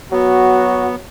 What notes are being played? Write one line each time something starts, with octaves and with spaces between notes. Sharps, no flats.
F#3 B3 F#4